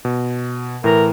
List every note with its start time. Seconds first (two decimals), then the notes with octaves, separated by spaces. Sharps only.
0.05 B2
0.84 A2 E3 A#4